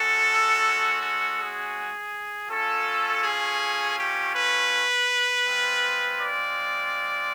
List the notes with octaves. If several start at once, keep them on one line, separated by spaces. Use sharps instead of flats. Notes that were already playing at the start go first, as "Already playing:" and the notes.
Already playing: G#3 C#4 F#4 A4
A4
G#4
A3 C#4 F4 A4
G#4
G4
B4
G#3 C4 F4
D5